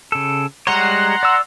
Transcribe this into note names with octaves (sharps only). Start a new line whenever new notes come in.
C#3 A4
G3 G#3 C#5 F#5 A#5 C6
D5 E6